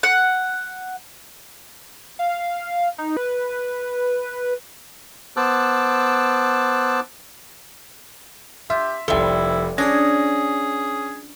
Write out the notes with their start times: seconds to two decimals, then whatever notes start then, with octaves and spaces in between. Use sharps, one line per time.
0.03 F#5
2.19 F5
2.98 D#4
3.17 B4
5.37 B3 C5 A5 D6 E6 F#6
8.70 F4 G4 E5
9.08 F1 F3 G3 E4 A4 E5 G7
9.78 C#4 D4 G#4 D#6 G#6 A#6